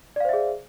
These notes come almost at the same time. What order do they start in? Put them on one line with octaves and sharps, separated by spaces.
D5 F5 C5 E5 G#4